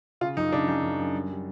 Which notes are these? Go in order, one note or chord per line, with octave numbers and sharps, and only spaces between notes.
C#3 F4
F#2 D#4
C#3 D4
F#2 D#4
F#2
F#2
G3
G3